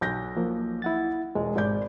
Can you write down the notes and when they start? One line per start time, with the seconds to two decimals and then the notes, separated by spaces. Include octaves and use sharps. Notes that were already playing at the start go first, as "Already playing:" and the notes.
0.01 B1 G6 A#6
0.37 F3 A#3
0.82 E4 F#5 A6
1.35 E1 G#3
1.56 G#1 D5 G6